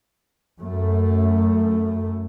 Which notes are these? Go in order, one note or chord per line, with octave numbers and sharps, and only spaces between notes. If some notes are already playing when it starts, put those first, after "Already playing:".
F#2 A3